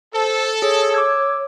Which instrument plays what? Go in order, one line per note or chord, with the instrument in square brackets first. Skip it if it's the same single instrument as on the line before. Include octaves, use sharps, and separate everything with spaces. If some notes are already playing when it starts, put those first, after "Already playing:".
[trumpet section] A4 [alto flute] C5
[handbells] G#4 [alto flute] C#5
[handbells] D6 E6 G#6